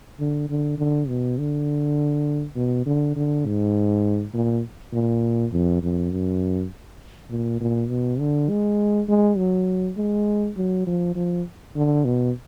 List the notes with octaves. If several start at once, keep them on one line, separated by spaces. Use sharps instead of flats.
D3
D3
D3
B2
D3
B2
D3
D3
G#2
A#2
A#2
F2
F2
F#2
A#2
A#2
B2
D3
G#3
G#3
F#3
G#3
F#3
F3
F3
D3
B2